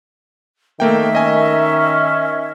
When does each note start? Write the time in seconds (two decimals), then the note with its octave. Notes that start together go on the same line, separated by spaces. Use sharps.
0.80 D#3 A3 A#3 E5 G5
1.15 C#4 D#5 G#5